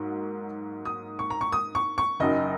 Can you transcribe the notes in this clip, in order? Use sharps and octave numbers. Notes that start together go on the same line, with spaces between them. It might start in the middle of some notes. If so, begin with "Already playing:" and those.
Already playing: G#2 F#3 A#3
D#6
C#6
A#5
C#6
D#6
C#6
C#6
F#1 F#2 F#3 D#4 D#5